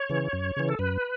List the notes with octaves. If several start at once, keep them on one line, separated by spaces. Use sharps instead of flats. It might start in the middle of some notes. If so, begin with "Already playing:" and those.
Already playing: C#5
C#3 E3
F#2
C#3 E3
A4
F#2 B4